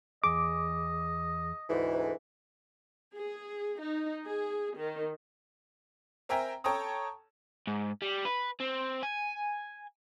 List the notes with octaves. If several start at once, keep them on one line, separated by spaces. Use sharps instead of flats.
E2 G#4 D#5 D6
D2 G#2 E3
G#4
D#4
G#4
D#3
C4 A#4 E5 G5 G#5 A#5
A4 C#5 G5 A5 A#5 D#6
G#2
G3
B4
C4
G#5